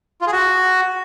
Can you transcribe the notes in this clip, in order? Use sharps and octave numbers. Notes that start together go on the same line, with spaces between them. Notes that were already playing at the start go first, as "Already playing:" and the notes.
F4
G#4
F#4